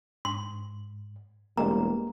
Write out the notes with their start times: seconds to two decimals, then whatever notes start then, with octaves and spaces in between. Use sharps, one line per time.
0.25 G#2 C6
1.57 E1 G3 G#3 A#3 A#5